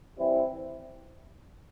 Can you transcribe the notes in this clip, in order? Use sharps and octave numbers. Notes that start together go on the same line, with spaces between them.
E3 G3 C4 E4